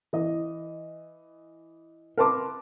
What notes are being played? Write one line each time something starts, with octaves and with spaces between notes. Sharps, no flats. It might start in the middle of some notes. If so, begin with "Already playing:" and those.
E3 D#5
A#4 B4 A5 C6 D6